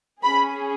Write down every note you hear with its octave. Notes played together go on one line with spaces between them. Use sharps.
C#4 G#4 B5